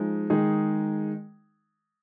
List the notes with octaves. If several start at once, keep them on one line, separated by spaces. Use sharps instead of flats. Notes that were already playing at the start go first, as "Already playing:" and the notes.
Already playing: F3 G#3 D#4
D#3 G#3 D#4 G#4